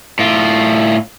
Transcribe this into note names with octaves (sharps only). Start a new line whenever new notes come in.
A2 F4